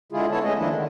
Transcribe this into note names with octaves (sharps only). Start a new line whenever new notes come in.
D3 G#3 E4 F4 G#4
B3 E4 A4 C#5 A5
G#3 A3 C#4 D#5
D#3 F3 A#3 D4 E4
D3 D#3